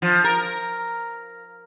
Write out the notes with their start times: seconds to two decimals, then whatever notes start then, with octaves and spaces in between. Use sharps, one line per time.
0.02 F3
0.24 A#4